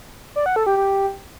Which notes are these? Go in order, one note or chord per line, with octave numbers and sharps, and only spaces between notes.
D5
F#5
A4
G4
G4